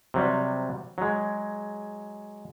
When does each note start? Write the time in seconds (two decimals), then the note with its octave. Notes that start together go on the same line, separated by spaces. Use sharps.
0.14 C3 F#3 G3
0.98 F#3 G#3